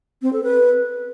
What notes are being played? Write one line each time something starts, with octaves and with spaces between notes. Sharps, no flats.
C4
A4
B4